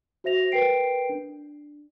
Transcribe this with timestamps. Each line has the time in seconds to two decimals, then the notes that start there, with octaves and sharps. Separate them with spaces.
0.24 F#4 C5 E5 A#6 F7
0.52 A#4 B4 G5 C7 D7
1.09 D4